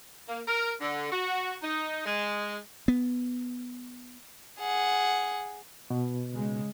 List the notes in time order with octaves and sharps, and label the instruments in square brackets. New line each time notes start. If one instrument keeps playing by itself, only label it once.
[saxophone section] A#3
A#4
D3
F#4
D#4
G#3
[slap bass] B3
[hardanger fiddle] G#4 F#5
[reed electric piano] B2
[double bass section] C#3 G#3